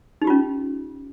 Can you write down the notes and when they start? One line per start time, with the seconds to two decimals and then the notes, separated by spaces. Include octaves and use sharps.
0.22 D#4
0.24 G4
0.27 F4
0.30 C#4